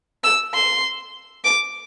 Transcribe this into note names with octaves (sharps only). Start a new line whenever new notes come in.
E6
C6
D6